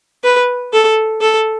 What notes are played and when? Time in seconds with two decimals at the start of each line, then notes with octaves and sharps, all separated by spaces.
0.24 B4
0.73 A4
1.21 A4